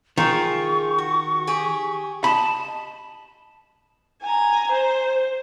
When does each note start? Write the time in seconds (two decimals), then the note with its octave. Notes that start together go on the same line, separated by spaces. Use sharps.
0.18 D#3 F4 G#4 C#6
0.98 F#4
1.47 G4 G#4
2.24 D#5 A5 B5
4.22 G#5 A#5
4.72 C5